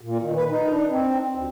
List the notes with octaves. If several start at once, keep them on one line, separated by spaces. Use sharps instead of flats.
A#2
D#3
B4
D#4
D4
C4
D2